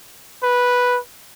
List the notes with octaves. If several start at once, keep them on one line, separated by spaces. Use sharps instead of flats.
B4